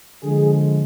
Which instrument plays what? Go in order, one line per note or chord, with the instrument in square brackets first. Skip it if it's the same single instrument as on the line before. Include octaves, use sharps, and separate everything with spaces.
[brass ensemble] D3 F3 G#3 G#4